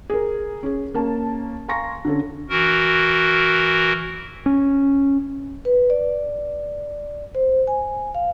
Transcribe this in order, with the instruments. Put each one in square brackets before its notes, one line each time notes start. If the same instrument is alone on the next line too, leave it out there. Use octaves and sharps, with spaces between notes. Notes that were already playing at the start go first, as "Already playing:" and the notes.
[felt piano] G#4 A#4
C#4 G#4
A#3 C#4 A5
F5 G#5 A#5 C6 C#6 A#6
D3 C#4 A4
[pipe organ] E3 F#4 A#4
[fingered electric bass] C#4
[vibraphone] B4
D5
C5
G#5
F5